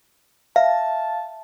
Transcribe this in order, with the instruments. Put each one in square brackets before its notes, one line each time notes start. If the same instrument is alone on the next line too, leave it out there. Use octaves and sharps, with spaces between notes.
[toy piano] E5 [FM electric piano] F5 [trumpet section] A5